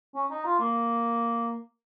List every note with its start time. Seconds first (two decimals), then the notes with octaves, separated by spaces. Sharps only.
0.15 C#4
0.30 D#4
0.45 F4
0.60 A#3